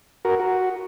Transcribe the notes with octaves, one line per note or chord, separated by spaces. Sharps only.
F#4 A#4
F#4